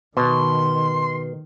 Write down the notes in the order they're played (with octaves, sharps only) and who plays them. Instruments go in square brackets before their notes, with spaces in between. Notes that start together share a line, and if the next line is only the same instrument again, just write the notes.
[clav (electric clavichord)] B2 [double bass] D#3 [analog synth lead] C6